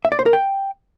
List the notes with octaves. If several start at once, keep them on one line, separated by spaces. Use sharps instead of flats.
E5
D5
C5
A#4
G5